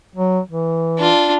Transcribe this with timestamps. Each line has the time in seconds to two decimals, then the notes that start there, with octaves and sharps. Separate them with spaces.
0.15 F#3
0.49 E3
0.99 D4 F4